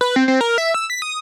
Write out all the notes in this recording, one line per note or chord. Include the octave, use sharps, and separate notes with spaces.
B4
C4
C4
A#4
E5
E6
B6
D#6